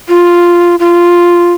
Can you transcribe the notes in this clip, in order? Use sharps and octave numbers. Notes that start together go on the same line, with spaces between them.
F4
F4